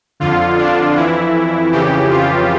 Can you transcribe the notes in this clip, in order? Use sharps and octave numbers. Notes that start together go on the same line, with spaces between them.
F2 D3 F4
D4
F2 E3 E4
F2 C#3 E3 G4
F4